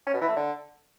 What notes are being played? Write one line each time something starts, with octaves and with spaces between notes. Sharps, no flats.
C#4
B2
E3
A3
D3